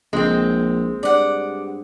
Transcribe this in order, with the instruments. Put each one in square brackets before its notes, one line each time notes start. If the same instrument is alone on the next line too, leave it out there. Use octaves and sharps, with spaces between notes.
[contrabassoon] A#1 [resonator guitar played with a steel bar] G#3 C4
[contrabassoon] G2 [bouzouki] D5 F#5